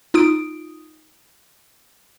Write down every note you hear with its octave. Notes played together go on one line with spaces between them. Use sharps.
D#4 F4 D#6 D7